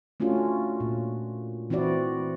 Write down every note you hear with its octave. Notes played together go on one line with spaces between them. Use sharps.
A3 C#4 D4 F4 F#4
A#2
E3 C4 E4 F#4 D5